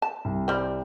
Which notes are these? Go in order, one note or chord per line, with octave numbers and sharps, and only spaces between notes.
A5
C2
G3 C4